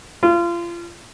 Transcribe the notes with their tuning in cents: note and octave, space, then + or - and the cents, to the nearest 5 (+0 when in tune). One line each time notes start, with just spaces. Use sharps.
F4 -30